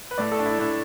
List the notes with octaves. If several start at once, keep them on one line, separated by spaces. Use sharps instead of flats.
B4
A2 A3 D5
A4
D4
E4
A2 A3 D4